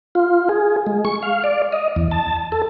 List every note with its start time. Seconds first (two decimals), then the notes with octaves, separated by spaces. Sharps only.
0.15 F4
0.49 G#4
0.86 G#3
1.05 C#6
1.23 F5
1.44 D5
1.72 D#5
1.96 E2
2.11 A5
2.52 A4